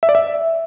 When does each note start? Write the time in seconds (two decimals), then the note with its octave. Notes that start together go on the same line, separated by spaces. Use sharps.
0.03 E5
0.09 D5
0.15 E5